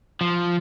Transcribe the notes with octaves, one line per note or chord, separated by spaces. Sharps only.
F3